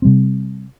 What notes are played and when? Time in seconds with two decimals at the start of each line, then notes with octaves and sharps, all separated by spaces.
0.02 C3 G3 C4